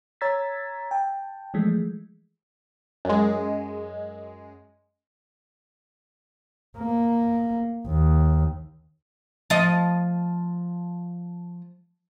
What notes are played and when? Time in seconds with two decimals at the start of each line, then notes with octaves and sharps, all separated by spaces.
0.21 C#5 A#5 E6 G#6 A6 B6
0.91 G5 A5
1.54 E3 F3 G#3 A3
3.05 F#2 G#3
6.78 A#3
7.87 D#2
9.50 F3 D#5